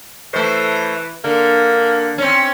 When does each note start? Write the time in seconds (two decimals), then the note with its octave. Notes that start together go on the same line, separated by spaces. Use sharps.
0.33 E3 A3 C5
1.24 D3 A#3
2.18 C4 C#4